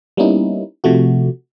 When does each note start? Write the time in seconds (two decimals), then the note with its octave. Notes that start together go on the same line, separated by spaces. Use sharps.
0.17 G3 A#3 B3 C#4 D#4 E4
0.84 C3 F3 A3 F#4